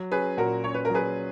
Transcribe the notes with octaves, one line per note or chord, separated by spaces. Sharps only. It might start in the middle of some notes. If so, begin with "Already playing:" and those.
Already playing: F#3
C#4 G#4 B4
A#2 F#4 A#4
C#4 C#5
B4
A#4
F#3 G#4 B4